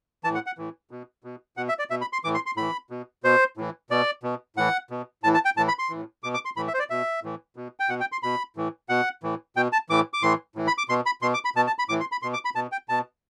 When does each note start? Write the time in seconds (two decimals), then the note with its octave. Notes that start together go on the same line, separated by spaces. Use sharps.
0.24 E3 A5
0.29 A2
0.35 F#5
0.46 F#5
0.58 A2 E3
0.91 B2
1.24 B2
1.57 B2 F#5
1.69 E5
1.79 D5
1.90 B2 E5
2.01 B5
2.13 C6
2.24 A2 E3 D6
2.35 C6
2.46 C6
2.57 A2 E3 B5
2.90 B2
3.24 B2 C5
3.57 A2 E3
3.90 B2 D5
4.23 B2
4.56 A2 E3 F#5
4.90 B2
5.23 A2 A5
5.27 E3
5.34 A5
5.45 G5
5.57 A2 E3 A5
5.68 B5
5.79 C6
5.90 A2 E3
6.23 B2 D6
6.34 D6
6.45 C6
6.56 A2 E3 B5
6.68 E5
6.74 C5
6.79 D5
6.90 B2 E5
7.23 A2 E3
7.56 B2
7.80 G5
7.89 B2 F#5
8.00 G5
8.12 C6
8.23 B2 B5
8.56 A2 E3
8.89 B2 F#5
9.23 A2 E3
9.56 B2 G5
9.73 A5
9.89 A2 E3 D6
10.13 D6
10.22 A2 E3 C6
10.56 A2 E3
10.67 B5
10.78 D6
10.89 B2 C6
11.06 B5
11.22 B2 C6
11.34 D6
11.45 B5
11.56 B2 A5
11.67 A5
11.79 B5
11.89 A2 E3 D6
12.00 C6
12.12 B5
12.22 B2 C6
12.34 D6
12.45 B5
12.55 B2 A5
12.72 G5
12.89 B2 A5